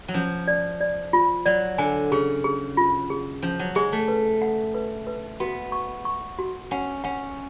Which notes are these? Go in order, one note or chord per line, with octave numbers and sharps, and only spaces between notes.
F#3
F3 C#4
D5
D5
F4
F#3 D5
D3 G#5
C#3 G#4
G#4
F4
G#4
F3 C#4
F#3
G#3 G#4
A3
B4
F#5
B4
B4
B3 F#4
C#6
C#6
F#4
C#4 F#5
C#4 F#5